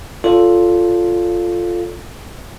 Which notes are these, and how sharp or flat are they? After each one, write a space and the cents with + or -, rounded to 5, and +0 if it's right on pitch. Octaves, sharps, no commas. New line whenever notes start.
F4 +0 A4 +0 C#5 +30